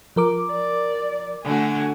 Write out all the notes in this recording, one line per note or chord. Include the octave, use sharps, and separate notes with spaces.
F3 A#4 D6
D5
D3 A3 F#4 G#5